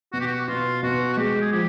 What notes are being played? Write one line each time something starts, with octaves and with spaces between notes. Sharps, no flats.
B2 F#4
G4
F#4
B2 F4
B2 F#4
F#4
G#3 G4
G#4
F3 G4